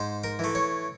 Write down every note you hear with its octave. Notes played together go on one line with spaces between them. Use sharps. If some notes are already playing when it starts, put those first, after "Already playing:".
Already playing: G#2 C5
A#4
E3 A3
C#5